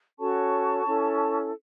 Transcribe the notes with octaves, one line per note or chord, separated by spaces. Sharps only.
C#4 F#4 A4 C#5 A5 C#6
C#4 E4 A4